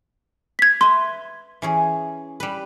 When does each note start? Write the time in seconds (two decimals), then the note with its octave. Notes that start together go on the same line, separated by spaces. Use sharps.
0.59 G#6 B6
0.81 B4 E5 C6
1.62 E3 C#4 G#4
2.40 G3 B4